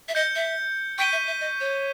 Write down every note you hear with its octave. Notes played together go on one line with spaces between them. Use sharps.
E5
D#5 G6 C#7 G7
E5
G5 C#6 G6 B6 D#7 G7
E5
E5
D#5
C#5